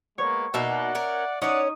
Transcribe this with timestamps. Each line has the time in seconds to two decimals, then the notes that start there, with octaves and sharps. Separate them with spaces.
0.18 G#3 A#3 B3 C#5
0.54 B2 A#3 D#4 D5 E5 F#5
0.95 C#4 A#4
1.42 C#4 D#4 C#5 D5 F#5 D#6